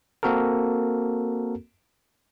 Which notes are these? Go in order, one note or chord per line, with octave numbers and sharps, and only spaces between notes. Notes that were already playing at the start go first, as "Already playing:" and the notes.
A#3 C4 F#4 A4 A#4